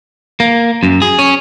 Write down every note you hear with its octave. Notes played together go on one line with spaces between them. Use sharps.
A#3
F#2
G#4
C#4